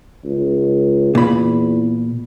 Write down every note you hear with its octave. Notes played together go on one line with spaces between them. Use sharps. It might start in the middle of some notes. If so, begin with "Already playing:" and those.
C#2
E2 A#2 B5